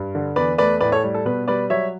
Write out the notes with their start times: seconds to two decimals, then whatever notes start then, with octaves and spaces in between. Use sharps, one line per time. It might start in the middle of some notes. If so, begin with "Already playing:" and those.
Already playing: G2
0.15 D3
0.36 E2 B4 D5
0.58 A3 B4 D5
0.81 A2 B4 D5
0.92 A4 C#5
1.04 G3
1.14 A4
1.25 B2 B4
1.48 G3 B4 D5
1.70 F#3 C#5 E5